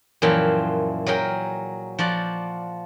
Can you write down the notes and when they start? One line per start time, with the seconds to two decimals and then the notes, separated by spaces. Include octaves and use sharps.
0.22 F#2 A#2 E3 F3 F5 G5
1.07 F#3 G#4 A#4 G5
1.99 F3 F#4 D5